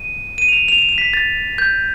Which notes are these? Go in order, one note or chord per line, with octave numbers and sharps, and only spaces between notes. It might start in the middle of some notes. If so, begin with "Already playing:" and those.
Already playing: D#7
D#7
F7
E7
F7
E7
E7
B6
A6
G6